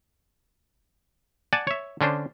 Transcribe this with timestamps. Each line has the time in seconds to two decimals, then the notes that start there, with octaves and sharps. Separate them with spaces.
1.53 D5 F#5 G#5 A5
1.67 C#5 E5
2.01 D3 C#4 D4 C5